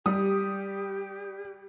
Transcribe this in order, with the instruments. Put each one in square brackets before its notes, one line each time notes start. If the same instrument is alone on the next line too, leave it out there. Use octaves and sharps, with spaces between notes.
[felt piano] G3 [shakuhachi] G4 [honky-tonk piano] D#6